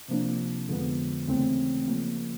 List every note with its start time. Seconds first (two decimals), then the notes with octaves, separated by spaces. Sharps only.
0.08 C3 F3 A#3 D4
0.68 F2 D3 F3 G#3 B3
1.27 D#2 C#3 E3 A3 C4
1.88 C#3 F3 A#3